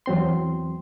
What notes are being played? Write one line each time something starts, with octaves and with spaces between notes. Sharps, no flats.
E2 F#3 C4 C6